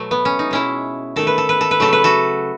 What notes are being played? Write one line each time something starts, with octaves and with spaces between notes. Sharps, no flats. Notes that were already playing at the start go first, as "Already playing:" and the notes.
Already playing: B2 F#3 A3
B3
C#4
D#4
B2 G#3 C#4 E4
D#3 A3 A4
B4
A4
B4
A4
B4
C#3 F#3 A3 A4
B4
F#4 A4